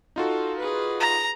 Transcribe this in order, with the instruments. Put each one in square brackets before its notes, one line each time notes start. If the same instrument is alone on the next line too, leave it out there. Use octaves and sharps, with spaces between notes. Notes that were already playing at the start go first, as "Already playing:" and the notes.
[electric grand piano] D#4 F4 F#4 [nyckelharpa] A4
[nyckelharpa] G#4 B4
[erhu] A#5